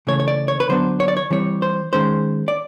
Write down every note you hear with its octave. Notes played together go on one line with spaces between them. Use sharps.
C#3 E3 A3 C#5
C#5
D5
C#5
B4
D3 F#3 B3 D4 C5
C#5
D5
C#5
E3 G3 C4 C#5
C5
D#3 G#3 C#4 C5
D5